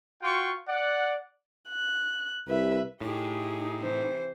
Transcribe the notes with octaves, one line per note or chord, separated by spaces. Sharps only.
F4 F#4 G5 C6 C#6
D5 F#5
F#6
C2 B4 E5
A2 D#4 G4 G#4
C3 E3 C5